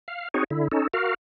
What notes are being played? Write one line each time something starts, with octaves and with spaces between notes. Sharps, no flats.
F5
C4 D#4 F#4 G#4 C#5
D3 E4
C#4 D#4 A4
F#4 A#4 F5